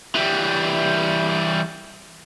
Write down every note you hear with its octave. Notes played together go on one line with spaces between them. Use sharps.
E3 G3